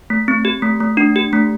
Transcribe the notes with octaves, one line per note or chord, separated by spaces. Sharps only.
A3
C4
G4
A3
A3
D4
G4
A3